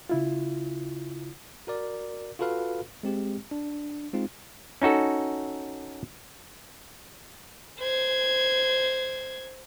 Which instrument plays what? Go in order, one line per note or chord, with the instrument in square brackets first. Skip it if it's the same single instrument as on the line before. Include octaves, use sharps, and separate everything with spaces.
[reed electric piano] C#3 E4 F4
[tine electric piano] F#4 A#4 D5
F4 F#4 A4 B4 F5
G#3 C4 G4
D4
G#3 C4 D#4 F4
[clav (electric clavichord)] C#4 D#4 F#4 A4
[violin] C5 G#6